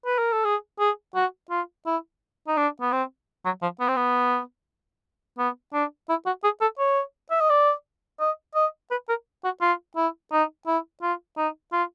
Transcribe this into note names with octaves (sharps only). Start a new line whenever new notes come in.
B4
A#4
A4
G#4
G#4
F#4
F4
E4
D#4
D4
B3
C4
F#3
F3
B3
C4
B3
B3
D4
E4
F#4
G#4
A4
C#5
E5
D#5
D5
D#5
D#5
B4
A#4
F#4
F4
E4
D#4
E4
F4
D#4
F4